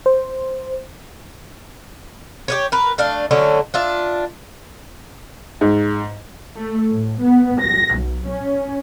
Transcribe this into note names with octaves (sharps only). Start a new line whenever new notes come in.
C5
G4 B4 C#5
A#4 B4
A3 D4 F5
D3 F#3 A3 C#4
D4 F4 E5
G#2
A3
A2
B3
A#6
B1
C#4